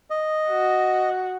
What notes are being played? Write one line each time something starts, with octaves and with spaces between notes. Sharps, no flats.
D#5
F#4